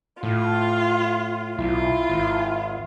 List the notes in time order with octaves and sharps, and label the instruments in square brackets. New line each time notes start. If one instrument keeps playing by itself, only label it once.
[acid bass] A2 [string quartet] F4
[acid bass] B1 [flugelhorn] E4 [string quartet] F4
[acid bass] G#1